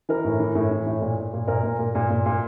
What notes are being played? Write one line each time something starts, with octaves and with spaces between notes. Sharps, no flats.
E3 A#4
A2
E3
A2
E3
A2
A#2
A#2
A#2
A#2 A#4
A#2
A#2
A#2
A#2
A#2